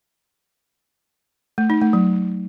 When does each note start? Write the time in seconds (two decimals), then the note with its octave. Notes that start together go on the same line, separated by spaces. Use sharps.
1.58 A3
1.70 D#4
1.81 A3
1.93 F#3